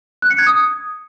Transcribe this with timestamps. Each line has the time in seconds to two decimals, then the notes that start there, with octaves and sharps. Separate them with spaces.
0.22 F#6
0.30 C#7
0.39 G#6
0.47 D#6